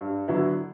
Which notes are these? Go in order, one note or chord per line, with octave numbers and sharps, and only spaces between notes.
G2
D3 F#3 B3 E4